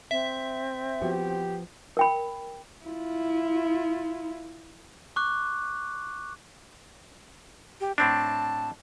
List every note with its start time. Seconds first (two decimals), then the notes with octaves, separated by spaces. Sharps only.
0.11 C4 E5
1.02 F3 B3 F#4 G4
1.97 A#4 G5 B5
2.85 E4 F4
5.16 C#6 D6 F#6
7.81 G4
7.98 A2 C4 D4 A5